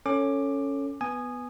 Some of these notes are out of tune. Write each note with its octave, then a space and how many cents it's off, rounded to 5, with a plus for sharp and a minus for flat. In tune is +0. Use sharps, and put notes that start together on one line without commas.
C#4 +0 A4 +20 D6 +15
B3 +0 G#5 +0 D#6 -15